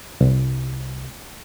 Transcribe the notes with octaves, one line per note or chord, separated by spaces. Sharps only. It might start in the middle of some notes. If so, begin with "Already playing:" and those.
C2